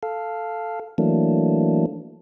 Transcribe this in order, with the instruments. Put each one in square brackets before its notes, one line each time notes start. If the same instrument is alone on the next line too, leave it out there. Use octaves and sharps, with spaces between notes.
[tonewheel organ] A4 F5
E3 F#3 A3 A#3 D4